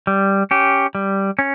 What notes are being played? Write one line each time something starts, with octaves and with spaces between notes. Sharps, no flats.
G3
C#4 G4
G3
C#4